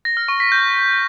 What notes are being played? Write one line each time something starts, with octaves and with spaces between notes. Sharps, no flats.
A#6
F6
C#6
B6
G6